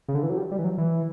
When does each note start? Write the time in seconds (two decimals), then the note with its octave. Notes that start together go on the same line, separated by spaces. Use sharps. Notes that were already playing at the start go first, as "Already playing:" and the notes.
0.08 C#3
0.15 D3
0.23 E3
0.30 F#3
0.37 G3
0.51 G3
0.59 E3
0.64 F#3
0.78 E3